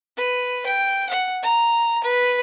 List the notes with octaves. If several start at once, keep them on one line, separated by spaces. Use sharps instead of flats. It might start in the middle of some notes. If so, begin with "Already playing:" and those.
B4
G5
F#5
A#5
B4